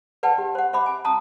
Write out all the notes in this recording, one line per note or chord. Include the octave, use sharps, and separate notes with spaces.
B4 D5 F#5 G5 A5
G4
C5 F#5
C5 E5 B5 D6
G#5
A5 A#5 D#6